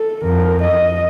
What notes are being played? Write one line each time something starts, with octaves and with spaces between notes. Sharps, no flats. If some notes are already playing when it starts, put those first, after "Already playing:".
Already playing: A4
F2 A#4
D#5